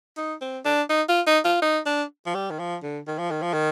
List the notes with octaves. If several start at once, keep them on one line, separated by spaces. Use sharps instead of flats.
D#4
C4
D4
D#4
F4
D#4
F4
D#4
D4
F3
G3
D#3
F3
D3
D#3
F3
D#3
F3
D#3